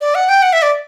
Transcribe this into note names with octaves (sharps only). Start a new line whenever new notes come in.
D5
F#5
G5
F#5
E5
D5